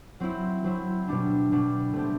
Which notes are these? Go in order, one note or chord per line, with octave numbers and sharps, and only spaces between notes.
F#3 C4 E4
F#3 C4 E4
B2 G3 D4
B2 G3 D4
B2 A3 C4 G4